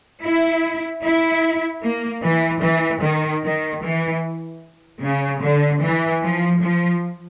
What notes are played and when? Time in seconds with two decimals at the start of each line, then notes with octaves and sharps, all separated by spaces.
0.23 E4
1.03 E4
1.83 A#3
2.23 E3
2.62 E3
3.02 D#3
3.42 D#3
3.82 E3
5.03 C#3
5.42 D3
5.82 E3
6.22 F3
6.61 F3